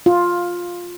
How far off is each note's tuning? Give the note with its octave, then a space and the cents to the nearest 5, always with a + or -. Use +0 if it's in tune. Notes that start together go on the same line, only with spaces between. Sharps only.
F4 +10